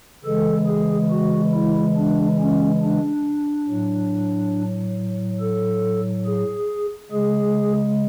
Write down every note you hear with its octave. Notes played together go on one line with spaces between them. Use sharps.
C#3 E3 G#3 A4
G#4
F#4
E4
D4
C#4
D4
A2 F#3
A4
G#4
C#3 G#3 G#4